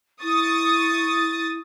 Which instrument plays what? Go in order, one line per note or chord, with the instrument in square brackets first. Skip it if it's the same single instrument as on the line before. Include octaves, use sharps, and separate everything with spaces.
[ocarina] E4 [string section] C#6 D#6 A6